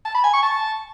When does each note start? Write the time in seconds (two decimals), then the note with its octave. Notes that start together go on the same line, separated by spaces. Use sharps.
0.05 A5
0.15 B5
0.24 G#5
0.33 C#6
0.43 A5